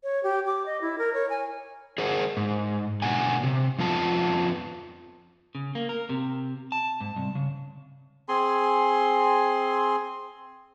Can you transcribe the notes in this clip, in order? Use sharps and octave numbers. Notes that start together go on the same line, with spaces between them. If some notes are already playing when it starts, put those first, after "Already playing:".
C#5
G4
D6
D#5
E4
A#4
C#5
G#5
G#4 A#4 C5 F#5
G#2
B2 D3 F#5 G#5
C3
F2 B3 F4 A5
C#3
A#3
A#4
C3
A5
G#2
C2
C#3
C4 G#4 G#5 C6